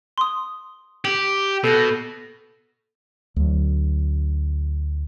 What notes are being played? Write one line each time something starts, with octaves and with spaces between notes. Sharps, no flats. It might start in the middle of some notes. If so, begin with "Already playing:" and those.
C6 D#6
G4 F#7
B2 A4 G6 A#6
D2 F#3